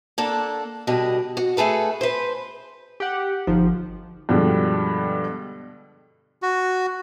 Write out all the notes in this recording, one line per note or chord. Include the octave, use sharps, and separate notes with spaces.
A#3 D4 A4 F#5
B2 D3 G3 D4 D#5
F#4
A3 G#4 A4 B4
B4 C5
G4 F#5
G1 F3 D#4
G2 B2 D3 F3 G3 G#3
F#4